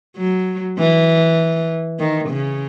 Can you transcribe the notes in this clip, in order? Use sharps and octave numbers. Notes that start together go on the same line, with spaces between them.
F#3
E3
D#3
C#3